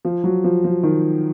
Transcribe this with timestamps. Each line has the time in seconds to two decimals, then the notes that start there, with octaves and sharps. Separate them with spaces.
0.05 F3
0.24 F#3
0.44 F3
0.64 F3
0.83 D#3